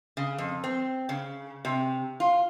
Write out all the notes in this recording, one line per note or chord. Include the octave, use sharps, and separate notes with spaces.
C#3
F2
C4
C#3
C3
F4